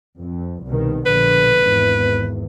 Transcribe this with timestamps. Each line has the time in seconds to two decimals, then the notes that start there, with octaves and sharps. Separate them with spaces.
0.20 F2
0.65 C2 B2 D#3
1.06 A#1 B2 D3 B4
1.63 G#1 E2